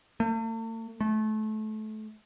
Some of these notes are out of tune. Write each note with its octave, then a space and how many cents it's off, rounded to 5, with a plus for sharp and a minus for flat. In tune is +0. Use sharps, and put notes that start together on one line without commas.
A3 +45
A3 -25